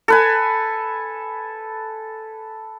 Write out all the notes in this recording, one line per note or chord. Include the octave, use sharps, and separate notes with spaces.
A4 B4 G#5